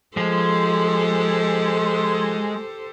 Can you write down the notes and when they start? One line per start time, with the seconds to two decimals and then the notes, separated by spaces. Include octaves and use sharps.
0.17 F3 G#3 G4 A4 C5